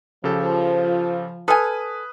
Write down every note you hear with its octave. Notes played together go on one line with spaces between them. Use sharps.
C#3 F3 G4 A4
A4 B4 G#5 D#6 F6